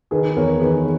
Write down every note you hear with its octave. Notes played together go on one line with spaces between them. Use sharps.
D#3 G#4 B4
E2 A#4 C#5
D#3 G#4 B4